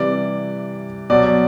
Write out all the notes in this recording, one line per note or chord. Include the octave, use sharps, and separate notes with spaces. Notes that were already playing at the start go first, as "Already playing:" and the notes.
Already playing: C3 E3 G3 D5
B2 F#3 D5